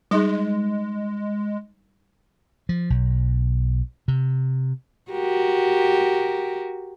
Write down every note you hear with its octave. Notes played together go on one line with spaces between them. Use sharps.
G3 G#3 D#4 G#4
F3
B1
C3
F#4 G4 A#4